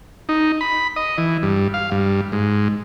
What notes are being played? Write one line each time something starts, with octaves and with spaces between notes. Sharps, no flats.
D#4
B5
D#5
E3
G2
F5
G2
G#2